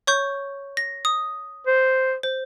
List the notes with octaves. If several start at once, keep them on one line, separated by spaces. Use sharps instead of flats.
C#5 C#6 G6
A#6
D#6
C5
C5